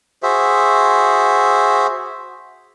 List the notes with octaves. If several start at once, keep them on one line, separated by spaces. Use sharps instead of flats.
F#4 G#4 C5 E5